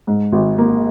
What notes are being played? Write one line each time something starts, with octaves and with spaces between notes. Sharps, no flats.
G#2
G#1
A#3